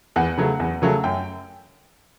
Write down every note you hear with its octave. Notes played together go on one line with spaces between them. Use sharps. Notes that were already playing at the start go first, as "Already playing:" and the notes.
E2 F#5
C#3 F#3 A3
E2
C#3 F#3 A3
F#2 G5